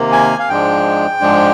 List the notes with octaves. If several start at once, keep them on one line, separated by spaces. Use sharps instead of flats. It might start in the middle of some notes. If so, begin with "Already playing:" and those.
Already playing: C3 D#3 A#3
G#5
F5
G#2 F3 G#3 D4 G5
G#2 F3 G#3 D4